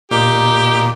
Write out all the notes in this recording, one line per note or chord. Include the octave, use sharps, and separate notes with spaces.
A#2 D#4 G4 D6